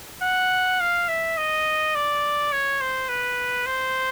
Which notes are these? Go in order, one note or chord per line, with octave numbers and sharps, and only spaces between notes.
F#5
F5
E5
D#5
D5
C#5
C5
B4
C5